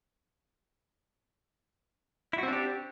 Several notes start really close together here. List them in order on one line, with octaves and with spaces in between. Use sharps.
E4 F#4 C4 D4 G4